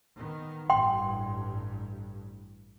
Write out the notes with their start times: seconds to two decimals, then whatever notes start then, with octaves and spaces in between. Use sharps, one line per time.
0.18 D#3 B3
0.70 A1 G2 G5 C6